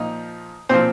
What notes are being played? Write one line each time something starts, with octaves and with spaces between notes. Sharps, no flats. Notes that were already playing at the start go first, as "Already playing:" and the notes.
Already playing: A#2 F3 D#4
A#2 F3 C4 C5